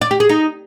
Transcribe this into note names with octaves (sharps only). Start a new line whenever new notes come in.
D5
G4
G#4
D#4